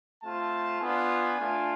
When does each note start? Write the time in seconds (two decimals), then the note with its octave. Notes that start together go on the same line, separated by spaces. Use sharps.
0.23 A3 C4 F4 A5
0.81 B3 D4 F4 G#5
1.38 A3 D4 F4